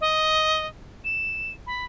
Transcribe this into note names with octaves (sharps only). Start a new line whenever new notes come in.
D#5
E7
B5